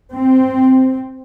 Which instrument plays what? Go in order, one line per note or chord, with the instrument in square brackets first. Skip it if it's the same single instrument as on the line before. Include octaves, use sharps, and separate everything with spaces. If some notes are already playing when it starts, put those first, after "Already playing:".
[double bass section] C4